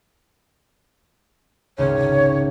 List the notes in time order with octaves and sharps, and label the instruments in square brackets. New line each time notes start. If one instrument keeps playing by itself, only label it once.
[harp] G#1 C#2 C#3 [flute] C#5